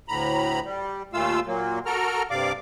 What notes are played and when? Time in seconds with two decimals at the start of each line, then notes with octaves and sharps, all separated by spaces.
0.08 D2 A2 A#5 B5
0.65 G3
1.13 D#2 A#2 A3 F4 F5 E6
1.47 A#2 F#3 A#3
1.86 F#4 A4 A#4 A#5 F6
2.30 G2 C3 D5 F5 D6